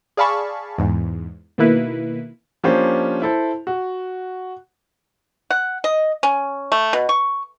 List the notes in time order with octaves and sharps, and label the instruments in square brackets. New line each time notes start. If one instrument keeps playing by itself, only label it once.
[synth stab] G#4 D5 F5 A5 B5 C#6
E2 G#2
B2 D#3 A#3 E4 B4
[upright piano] F3 A#3 C#4 D4 G4 C5
E4 A4 C5
F#4
[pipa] F#5
D#5
C#4
A3
B2
C#6